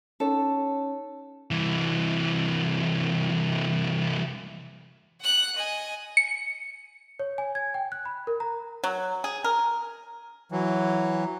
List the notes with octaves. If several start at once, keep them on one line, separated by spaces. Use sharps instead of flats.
C#4 D#4 A4 C#5
C2 E3
F#5 F#6
D#5 G#5
C#7
C#5
G#5
G#6
G5
F#6
B5
A#4
A#5
F#3
G#4
A#4
E3 F#3